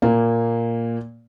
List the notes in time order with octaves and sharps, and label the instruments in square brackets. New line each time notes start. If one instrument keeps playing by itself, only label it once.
[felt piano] A#2 A#3